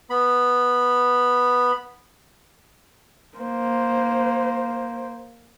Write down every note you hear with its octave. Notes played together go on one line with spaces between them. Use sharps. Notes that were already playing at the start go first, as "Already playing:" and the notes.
B3 B5
A#3 C5